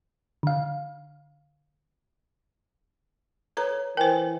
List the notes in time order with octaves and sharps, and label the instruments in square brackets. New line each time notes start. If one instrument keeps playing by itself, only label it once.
[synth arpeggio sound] D3 F5
[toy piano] A4 C#5 [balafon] B4 A#5
[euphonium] E3 [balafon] A#4 C5 [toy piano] G5 G#5